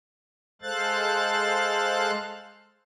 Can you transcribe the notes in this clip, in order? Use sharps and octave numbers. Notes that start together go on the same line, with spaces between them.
G#3 A4 C5 F5 F#6 A6